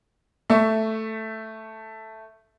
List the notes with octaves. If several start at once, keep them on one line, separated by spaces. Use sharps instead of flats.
A3 E5 C#6